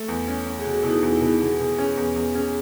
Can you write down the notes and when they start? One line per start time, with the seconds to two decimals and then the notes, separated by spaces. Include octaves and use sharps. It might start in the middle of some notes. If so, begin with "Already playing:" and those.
Already playing: A3
0.08 E2
0.28 C#4
0.45 C#4
0.59 G#4
0.65 B2 F#4
0.83 B2 E4
0.90 D#4
1.02 E2
1.15 E4
1.21 B2
1.40 B2 G#4
1.60 B2
1.78 C#4
1.97 E2
2.16 E2
2.35 C#4